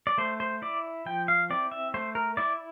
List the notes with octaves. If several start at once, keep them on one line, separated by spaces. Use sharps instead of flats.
D5
A3 C5
C5
E4 D5
F3 G5
F5
C4 E4 D5
E5
A3 C5
A#4
E4 D5